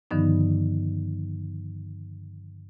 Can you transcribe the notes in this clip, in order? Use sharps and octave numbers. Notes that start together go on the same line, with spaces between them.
G2 D3 D#3 F3 B3 D#4